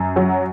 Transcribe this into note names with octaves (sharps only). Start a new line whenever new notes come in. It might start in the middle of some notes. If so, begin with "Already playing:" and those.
Already playing: F#2
F#3